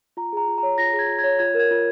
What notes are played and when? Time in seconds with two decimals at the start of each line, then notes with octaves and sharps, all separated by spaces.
0.17 F4 A#5
0.33 G#4 A#5
0.48 F4
0.58 C#5 A#5
0.78 F4 A#6
0.93 G#4
0.99 G#6
1.09 F4
1.19 G#6
1.24 C#5
1.39 F4 G#6
1.54 A#4
1.59 G#6
1.71 F4